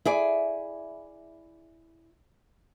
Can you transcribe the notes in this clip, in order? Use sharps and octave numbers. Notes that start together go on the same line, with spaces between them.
E4 G#4 D5